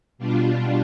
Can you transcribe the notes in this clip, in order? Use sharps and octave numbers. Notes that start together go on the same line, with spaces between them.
B2 G3 D4 F4